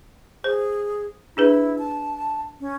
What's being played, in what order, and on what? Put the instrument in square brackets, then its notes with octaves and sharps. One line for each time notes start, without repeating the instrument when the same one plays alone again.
[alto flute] G#4 [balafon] C5
[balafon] D4 G#4 B4 [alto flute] E4
[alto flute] A5
C#4